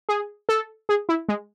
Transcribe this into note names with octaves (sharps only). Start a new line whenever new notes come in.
G#4
A4
G#4
E4
G#3